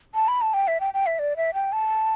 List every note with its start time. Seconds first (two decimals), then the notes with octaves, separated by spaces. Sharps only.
0.15 A5
0.28 B5
0.42 A5
0.54 G5
0.68 E5
0.80 G5
0.94 G5
1.06 E5
1.19 D5
1.37 E5
1.54 G5
1.72 A5